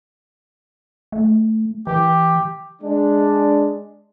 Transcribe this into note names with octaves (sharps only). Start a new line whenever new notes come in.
A3
E3 G4
G#3 D4